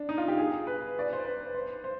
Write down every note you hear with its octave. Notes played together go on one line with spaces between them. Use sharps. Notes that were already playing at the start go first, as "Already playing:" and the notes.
Already playing: D4
D#4
F4
G4
G#4
B4
D5
C5
B4
C5
C5